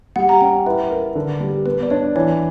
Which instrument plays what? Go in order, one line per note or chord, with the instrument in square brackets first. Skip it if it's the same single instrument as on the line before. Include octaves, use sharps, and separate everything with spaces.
[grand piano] G3 [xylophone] F#5
[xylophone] A#5
[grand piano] C#4 [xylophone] G5
[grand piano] E4 [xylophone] B4
[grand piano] A#4
D3
G3
[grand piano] B3 [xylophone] B4
[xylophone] D5
[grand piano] D4 [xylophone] C#5
[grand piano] E3 [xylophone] C#5